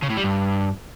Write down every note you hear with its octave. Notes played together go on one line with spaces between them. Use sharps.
C#3
A2
G3
G2